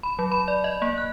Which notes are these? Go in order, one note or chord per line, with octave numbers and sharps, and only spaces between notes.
B5
F#3
B5
D5
D#5
A#3
F#6